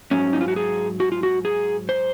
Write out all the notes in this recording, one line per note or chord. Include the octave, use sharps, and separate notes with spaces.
G#2 F#3 C#4
D#4
F4
F#4
G#4
F#4
F4
F#4
G#4
C5